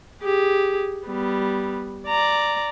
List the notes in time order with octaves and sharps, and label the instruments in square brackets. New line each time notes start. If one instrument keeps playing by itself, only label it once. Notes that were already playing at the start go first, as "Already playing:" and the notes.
[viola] G4 G#4
G3 B3
D5 A#5